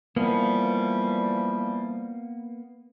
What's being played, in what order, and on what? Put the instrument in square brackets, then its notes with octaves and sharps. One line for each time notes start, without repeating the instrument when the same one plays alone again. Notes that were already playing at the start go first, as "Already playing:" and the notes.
[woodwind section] E3 F3 G3 [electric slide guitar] A#3 B3